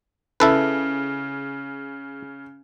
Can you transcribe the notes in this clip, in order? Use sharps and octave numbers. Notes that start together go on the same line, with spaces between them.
C#3 E4 A4 B4